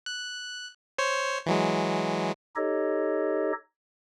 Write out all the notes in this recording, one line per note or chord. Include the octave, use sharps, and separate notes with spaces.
F#6
C5 C#5 C7
E3 F#3 G#3
D#4 G4 A4 C#5 D#5